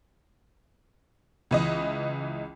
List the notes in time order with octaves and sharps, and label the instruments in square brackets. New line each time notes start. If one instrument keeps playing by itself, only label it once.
[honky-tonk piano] C#2 E3 D#5